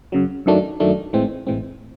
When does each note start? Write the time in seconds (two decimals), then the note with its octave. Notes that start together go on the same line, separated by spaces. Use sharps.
0.12 F#2 C#3 F#3
0.46 F#2 D#3 F#3 A3 D4
0.80 F#2 D#3 F#3 A3 D4
1.13 A1 A2 E3 G#3 C4
1.47 A1 A2 E3 G#3 C4